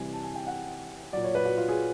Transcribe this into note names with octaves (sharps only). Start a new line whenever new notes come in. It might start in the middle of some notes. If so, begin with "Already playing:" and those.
Already playing: C3 E3 G3 G#5
A5
G#5
G5
F#5
A#2 F#3 D5
C#5
B4
F#4
F4
G#4